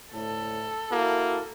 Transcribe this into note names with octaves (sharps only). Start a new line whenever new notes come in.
D2 A2 A4
A#3 E4 F#4